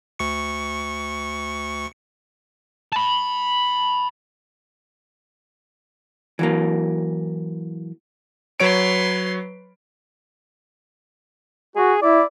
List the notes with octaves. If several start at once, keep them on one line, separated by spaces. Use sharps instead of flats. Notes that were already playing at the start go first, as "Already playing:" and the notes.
D2 C#6 C#7
A5 B5
E3 F#3 A#3
F#3 B4 C#5 C6 D7
F#4 G#4
E4 D5